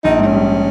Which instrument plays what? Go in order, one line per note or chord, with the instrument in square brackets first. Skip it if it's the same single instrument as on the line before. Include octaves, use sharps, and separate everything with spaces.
[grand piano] A#1 [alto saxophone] D#4
[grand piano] G#2 [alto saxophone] D#4
[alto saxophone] C#4
[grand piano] G3